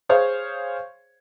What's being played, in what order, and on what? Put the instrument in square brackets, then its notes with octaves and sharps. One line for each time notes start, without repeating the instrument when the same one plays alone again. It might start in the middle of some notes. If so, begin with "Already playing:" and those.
[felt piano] G#4 C5 C#5 F5